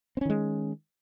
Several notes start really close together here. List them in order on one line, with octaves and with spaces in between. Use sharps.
C4 C#4 D#3 G#3